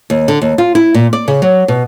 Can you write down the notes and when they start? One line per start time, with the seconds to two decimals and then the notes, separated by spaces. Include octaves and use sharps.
0.10 D#2
0.28 D3
0.42 D#2
0.58 F4
0.75 E4
0.94 A#2
1.13 D5
1.28 C#3
1.42 F#3
1.68 B2